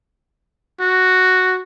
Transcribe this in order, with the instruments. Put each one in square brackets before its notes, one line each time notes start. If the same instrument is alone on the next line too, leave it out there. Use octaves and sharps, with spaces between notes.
[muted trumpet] F#4